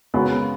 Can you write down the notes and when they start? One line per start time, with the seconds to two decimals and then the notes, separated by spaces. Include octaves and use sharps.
0.14 C#3 G#3 B3 F#4 A#4